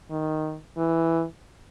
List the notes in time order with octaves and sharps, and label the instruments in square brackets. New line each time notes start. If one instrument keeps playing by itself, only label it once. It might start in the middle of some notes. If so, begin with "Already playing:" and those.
[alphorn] D#3
E3